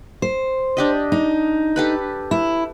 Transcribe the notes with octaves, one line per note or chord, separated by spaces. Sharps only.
C5
D4 G4 D#5
D#4
G4 A4 B4
E4